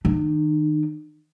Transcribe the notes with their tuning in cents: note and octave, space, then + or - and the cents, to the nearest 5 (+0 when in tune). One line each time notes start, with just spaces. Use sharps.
D#3 +0 D#4 -45